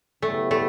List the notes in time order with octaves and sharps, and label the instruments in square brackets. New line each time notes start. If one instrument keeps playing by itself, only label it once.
[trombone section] C#3 F#3 B3 E4 G4 [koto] A3
[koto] A3